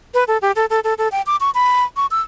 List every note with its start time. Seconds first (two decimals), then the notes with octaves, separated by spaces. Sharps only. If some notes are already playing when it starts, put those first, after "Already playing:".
0.14 B4
0.28 A4
0.42 G4
0.56 A4
0.70 A4
0.84 A4
0.98 A4
1.12 G5
1.26 D6
1.41 C#6
1.55 B5
1.97 C#6
2.11 E6